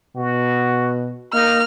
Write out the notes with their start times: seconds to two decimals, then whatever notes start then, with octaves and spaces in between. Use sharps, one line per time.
0.16 B2 F#4
1.33 A#3 D#4 F6